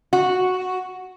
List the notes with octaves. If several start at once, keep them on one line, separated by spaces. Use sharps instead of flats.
F#4